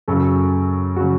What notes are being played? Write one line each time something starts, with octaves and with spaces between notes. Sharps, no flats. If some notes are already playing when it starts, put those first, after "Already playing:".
F#2 C#3 F#3 A4
C#3 F#3 F#4